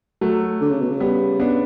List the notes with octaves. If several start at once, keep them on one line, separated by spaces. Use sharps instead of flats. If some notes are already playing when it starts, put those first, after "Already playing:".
F#3 A3
D3
C#3
B2
C#3
G3 B3
B3 D4